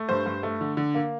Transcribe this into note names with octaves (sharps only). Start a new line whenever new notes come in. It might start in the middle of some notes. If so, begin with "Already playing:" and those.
Already playing: A3
G2 C5
G2
A3
D3
D3
A#3